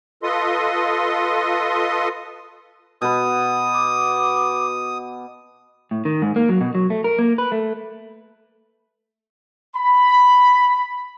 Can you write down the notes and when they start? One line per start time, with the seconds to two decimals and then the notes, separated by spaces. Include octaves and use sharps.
0.23 F4 A4 B4 D#5 C6 D#6
3.02 B2 B4 D#6
3.74 D6
5.91 A2
6.05 D#3
6.22 G#2
6.36 A#3
6.49 F#3
6.61 B2
6.75 F#3
6.90 A3
7.04 A#4
7.19 A#3
7.38 B4
7.52 A3
9.76 B5